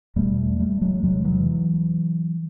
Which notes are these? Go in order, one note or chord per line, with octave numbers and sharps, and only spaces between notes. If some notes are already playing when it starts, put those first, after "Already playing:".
E2 B2 G3 A3
G3 A3
F#3 G#3
E2 C3 F#3 G#3
E3 F#3